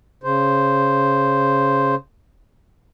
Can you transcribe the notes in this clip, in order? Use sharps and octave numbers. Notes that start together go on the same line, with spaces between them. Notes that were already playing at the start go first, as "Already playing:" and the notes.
C#3 C5